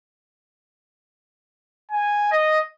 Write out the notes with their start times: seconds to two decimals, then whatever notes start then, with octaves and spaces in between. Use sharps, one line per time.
1.91 G#5
2.32 D#5